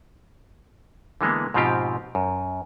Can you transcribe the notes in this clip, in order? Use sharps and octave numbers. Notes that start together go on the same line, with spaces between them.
D3 E3 G#3 A#3 B3
G#2 B2 F3 C4 F4 G4
F#2